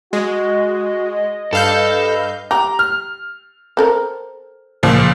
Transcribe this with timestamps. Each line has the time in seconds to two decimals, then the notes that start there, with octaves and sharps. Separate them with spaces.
0.13 G#3 F#4 D#5
1.53 G2 A4 B4 F5 G6
2.51 G4 A#5
2.79 F6
3.77 C4 A4 A#4
4.83 C#2 A#2 F3